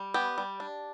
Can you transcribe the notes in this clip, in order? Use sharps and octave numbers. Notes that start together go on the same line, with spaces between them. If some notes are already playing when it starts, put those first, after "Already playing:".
Already playing: G3
B3 G4
G3
D4